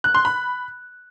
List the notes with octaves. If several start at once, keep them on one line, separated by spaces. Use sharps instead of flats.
F#6
C6
B5